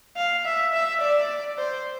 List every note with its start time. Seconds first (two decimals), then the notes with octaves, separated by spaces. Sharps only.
0.16 F5
0.46 E5
0.73 E5
1.01 D5
1.58 C5